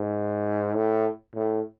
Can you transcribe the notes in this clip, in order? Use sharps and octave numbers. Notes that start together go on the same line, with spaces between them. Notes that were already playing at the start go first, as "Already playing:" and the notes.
Already playing: G#2
A2
A2